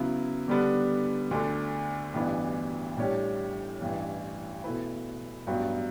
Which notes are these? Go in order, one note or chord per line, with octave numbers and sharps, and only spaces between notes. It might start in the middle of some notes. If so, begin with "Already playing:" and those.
Already playing: C#3 F#3 B3 E4
D3 G3 B3 D4
D2 D3 A3 D4
A1 G2 E3 B3 D4
A2 G3 D4 G4 C#5
A1 G2 E3
B2 A3 E4 B4
A1 G2 F#3 B3 F#4